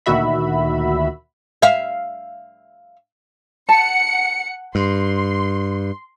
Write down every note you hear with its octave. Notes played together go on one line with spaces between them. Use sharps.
D2 A#2 D#3 F#4 E5 B5
E5 F5
F#5 A5 C#7
G2 C6